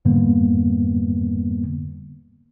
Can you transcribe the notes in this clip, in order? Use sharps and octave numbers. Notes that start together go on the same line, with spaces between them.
F2 G#2 D3 G3 A#3 B3